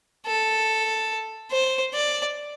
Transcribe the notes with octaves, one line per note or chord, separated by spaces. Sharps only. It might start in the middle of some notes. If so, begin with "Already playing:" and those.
A4
C5
D5